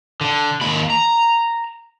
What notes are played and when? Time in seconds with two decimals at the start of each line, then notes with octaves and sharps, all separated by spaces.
0.21 D3
0.61 D#2 B5
0.90 A#5